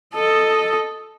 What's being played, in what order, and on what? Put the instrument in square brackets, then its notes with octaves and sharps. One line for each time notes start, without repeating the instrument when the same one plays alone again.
[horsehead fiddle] A4 D#5